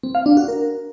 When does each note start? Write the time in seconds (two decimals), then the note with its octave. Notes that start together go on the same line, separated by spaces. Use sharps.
0.03 C4
0.15 F5
0.26 D4
0.37 F#4
0.48 A#4